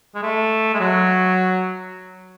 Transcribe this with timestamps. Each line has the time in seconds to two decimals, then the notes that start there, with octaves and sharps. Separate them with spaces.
0.15 G#3
0.23 A3
0.74 G#3
0.80 F#3